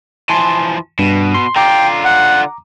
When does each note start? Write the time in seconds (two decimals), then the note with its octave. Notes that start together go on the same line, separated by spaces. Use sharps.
0.29 E3 F3 G#5 A5 C6
0.99 G2 B2
1.34 C6
1.56 D3 F4 G5 A#5 D6
2.05 F#5